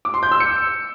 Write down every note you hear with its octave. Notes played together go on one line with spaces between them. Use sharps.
D6
C6
G6
E6
C#7